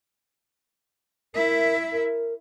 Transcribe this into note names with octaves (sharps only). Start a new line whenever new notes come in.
E4 A#4 E5
A#4